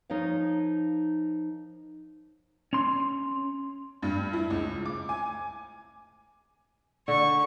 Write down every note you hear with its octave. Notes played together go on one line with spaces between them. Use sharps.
F3 D#4 A#4 C#5 F5
C#4 C6
G2
E4
C#2
D6
G#5
D3 C#6